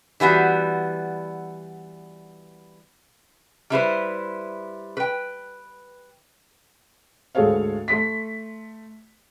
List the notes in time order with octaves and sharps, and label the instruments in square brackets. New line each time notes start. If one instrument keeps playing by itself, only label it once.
[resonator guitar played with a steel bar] E3 G3 B3 F#4
G3 E4 B4 C5
B4 G5
[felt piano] D2 G#2 G#4 A4 C#5 F5
A3 C6 B6